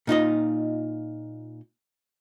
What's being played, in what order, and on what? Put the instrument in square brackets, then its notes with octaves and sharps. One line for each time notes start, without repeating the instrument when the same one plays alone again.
[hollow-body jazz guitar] A#2 D#4 F4 D#5